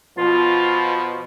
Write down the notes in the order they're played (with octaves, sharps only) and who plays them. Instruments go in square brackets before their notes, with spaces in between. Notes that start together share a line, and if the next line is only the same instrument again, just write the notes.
[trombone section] B2 F3 [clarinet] F4